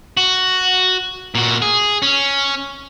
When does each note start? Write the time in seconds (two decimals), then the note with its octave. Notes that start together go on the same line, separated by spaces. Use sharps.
0.17 F#4
1.35 A#2 F#4
1.62 G#4
2.02 C#4